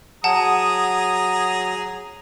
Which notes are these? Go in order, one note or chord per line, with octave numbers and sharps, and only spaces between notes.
F#3 G#4 F#5 A5 A#5 D#6